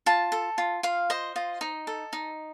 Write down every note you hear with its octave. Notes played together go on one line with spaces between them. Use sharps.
F4 A5
A4
F4
F4 F5
C5 D#5
F4 D#5
D#4
A4
D#4